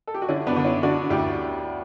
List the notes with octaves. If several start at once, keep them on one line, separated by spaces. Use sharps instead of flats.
A4
G4
F#4
D3 C#4 E4
B3 D4
D3
C#4 E4
D3 D4 F#4
D2 E4 G4